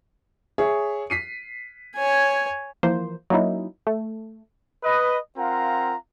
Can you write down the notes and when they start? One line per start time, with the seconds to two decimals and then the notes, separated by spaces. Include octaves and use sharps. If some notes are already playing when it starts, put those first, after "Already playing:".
0.58 G#4 C#5 E5
1.10 B6 C7 D#7
1.96 C#5 G#5
2.83 E3 F3 A#3 C5
3.30 F#3 A#3 C#4 D#4 E4
3.87 A3
4.83 B4 D#5
5.37 C4 F4 A#4 F5 F#5 A#5